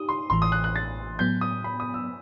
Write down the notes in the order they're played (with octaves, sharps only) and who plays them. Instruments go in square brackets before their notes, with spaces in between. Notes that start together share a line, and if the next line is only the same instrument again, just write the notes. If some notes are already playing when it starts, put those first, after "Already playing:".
Already playing: [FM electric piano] D#4 G4 [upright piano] D#6
[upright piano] C6
[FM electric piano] A1 A2 E3 [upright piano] C6
[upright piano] D#6
F#6
F#6
A6
[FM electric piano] A2 F#3 B3 [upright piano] G6
[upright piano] D#6
B5
D#6
E6